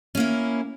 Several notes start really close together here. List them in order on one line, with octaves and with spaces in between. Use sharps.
C#4 A#3 E4